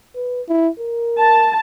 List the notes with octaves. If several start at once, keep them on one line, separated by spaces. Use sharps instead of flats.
B4
E4
A#4
A5